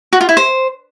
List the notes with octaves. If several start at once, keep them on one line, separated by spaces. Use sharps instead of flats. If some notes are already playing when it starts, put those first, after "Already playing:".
F#4
F4
E4
C5